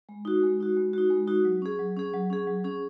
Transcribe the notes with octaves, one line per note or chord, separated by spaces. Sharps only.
G#3
D#4 F#4
G#3
D#4 F#4
G#3
D#4 F#4
G#3
D#4 F#4
F#3
C#4 G#4
F#3
C#4 G#4
F#3
C#4 G#4
F#3
C#4 G#4